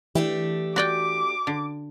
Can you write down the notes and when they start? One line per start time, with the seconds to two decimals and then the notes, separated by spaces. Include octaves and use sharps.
0.15 E3 A3 D4 G4
0.76 F#4 D5 G5 D6
1.47 D3